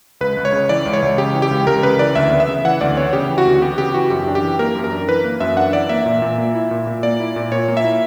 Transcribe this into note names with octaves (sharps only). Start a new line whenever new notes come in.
C#2 B4
C#2
C#5
C#3
E3 D5
C#2
C#5
C#2
C#3 G4
E3
G4
C#2
C#2 A#4
C#3 B4
E3 D5
D2 E5
B3
E5
C#3
E3 F#5
D2 D5
B3 C#5
C#3 G4
E3
F#4
D2
B3 G4
C#3 G4
E3 F#4
F#2 G4
D4
G4
E3
A#3 A#4
F#2
A#4
D4
E3 B4
A#3
F#2 E5
D4 F#5
E3 D5
A#3 E5
A#2
A#2
A#3
E4
A#2
A#2
A#3 D5
E4
A#2
A#2 C#5
A#3
E5
E4